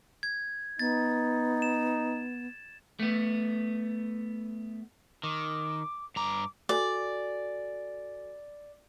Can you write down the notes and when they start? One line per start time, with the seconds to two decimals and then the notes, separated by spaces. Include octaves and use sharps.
0.23 G#6
0.79 B3 D#4 A6
1.62 E7
3.00 A3 B3
5.23 D#3 D6
6.16 G2 A#5 D6
6.69 F#4 A4 D5 G#5